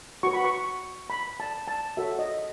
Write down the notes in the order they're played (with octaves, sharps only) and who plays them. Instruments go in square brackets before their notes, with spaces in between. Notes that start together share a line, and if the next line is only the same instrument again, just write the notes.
[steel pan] F#4 B4 C#6
B5
C#6
B5
A5
A5
F#4 A4 C#5 E5
D#5